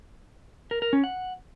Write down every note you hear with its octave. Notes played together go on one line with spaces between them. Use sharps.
A#4
A#4
C#4
F#5